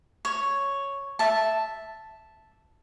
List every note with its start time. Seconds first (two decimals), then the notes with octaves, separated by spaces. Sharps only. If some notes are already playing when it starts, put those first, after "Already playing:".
0.25 C#5
1.19 E5 A5